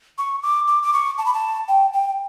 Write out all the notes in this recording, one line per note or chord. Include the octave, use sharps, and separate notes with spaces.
C#6
D6
D6
D6
C#6
A5
B5
A5
G5
G5